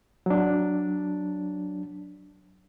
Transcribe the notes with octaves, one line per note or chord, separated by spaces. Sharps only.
F#3 D4